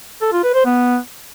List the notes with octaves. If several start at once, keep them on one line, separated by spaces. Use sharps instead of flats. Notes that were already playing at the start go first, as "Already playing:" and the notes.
A4
F4
B4
C5
B3